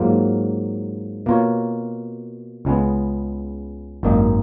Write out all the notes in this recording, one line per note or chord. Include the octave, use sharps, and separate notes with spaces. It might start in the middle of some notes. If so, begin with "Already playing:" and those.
Already playing: G#2 F#3 A#3 F4
B2 A#3 F4 A#4 C#5
C#2 C#3 G#3 B3
G#1 F#2 D#3 A#3 D#4